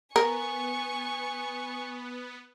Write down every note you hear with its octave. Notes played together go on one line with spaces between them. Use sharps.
B3 A#4 G#5 C#6